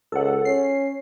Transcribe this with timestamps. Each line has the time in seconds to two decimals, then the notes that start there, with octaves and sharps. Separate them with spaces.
0.12 C#2 A4 F#5
0.45 C#4 C7